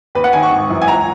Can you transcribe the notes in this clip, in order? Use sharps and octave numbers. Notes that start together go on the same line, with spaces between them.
D#2 B4
F#5
D#3 G#5
C#6
G#1
F#2 E3
G#5
C#2 A#5